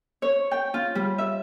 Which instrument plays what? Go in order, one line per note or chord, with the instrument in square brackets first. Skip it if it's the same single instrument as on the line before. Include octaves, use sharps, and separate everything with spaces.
[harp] C#5
G5
F4
G3
E5